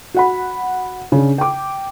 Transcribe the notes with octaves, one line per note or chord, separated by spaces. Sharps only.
F#4 F#5 B5
C#3 D4
G5 D6